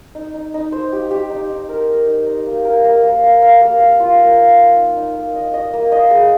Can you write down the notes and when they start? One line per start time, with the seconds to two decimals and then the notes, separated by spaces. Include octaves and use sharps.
0.15 D#4
0.34 D#4
0.54 D#4
0.72 C5
0.93 G4
1.11 G4
1.30 D#4
1.50 D#4
1.69 A#4
1.89 A#4
2.07 D#4
2.26 D#4
2.47 A#3
2.65 A#4
2.84 A#3
3.03 A#3
3.23 F5
3.42 F5
3.62 A#3
3.80 F5
4.00 F4
4.19 A#3
4.38 F5
4.58 A#3
4.76 D#4
4.96 D#4
5.15 A#3
5.35 D#5
5.54 D#5
5.73 A#3
5.92 D#5
6.11 G#4